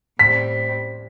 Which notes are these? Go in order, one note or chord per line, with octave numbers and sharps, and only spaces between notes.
A2 G3 C4 B6